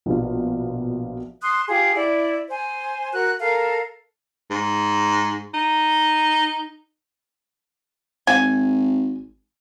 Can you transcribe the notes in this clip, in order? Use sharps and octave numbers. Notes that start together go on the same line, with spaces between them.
A#1 B2 F4
C6 D#6 F#6
F4 G4 G#4
E4 D5
C5 G#5
F#4 A#4 F#6
A4 A#4 F5
G#2
D#4
G#1 G#5